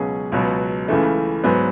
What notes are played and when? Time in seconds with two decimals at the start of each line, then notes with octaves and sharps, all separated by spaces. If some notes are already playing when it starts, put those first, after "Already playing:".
Already playing: C#2 B2 F#3 C#4 G#4
0.32 C#2 B2 F#3 B3
0.88 C#2 C#3 E3 A3
1.44 G#2 F#3 B3